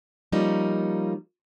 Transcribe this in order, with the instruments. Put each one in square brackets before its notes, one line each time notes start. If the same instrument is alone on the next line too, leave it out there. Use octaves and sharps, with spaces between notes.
[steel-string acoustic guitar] F3 G3 A#3 C#4 D#4